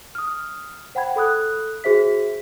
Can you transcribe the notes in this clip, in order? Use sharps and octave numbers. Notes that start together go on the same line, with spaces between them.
D#6 F6
C5 F#5 G5 B5 G#6
A4 B5 D#6 F#6
F#4 G#4 C5 E5 B6